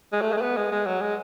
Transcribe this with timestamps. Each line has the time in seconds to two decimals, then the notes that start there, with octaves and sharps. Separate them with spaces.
0.13 G#3
0.21 A3
0.32 G#3
0.37 A3
0.42 B3
0.57 G#3
0.72 G#3
0.87 F#3
1.02 G#3